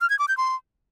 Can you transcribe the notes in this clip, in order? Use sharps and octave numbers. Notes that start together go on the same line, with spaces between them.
F6
G#6
D6
G6
C6